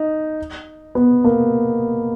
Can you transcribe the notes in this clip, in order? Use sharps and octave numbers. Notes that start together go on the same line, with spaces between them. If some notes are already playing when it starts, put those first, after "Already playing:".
Already playing: D#4
B3
A#3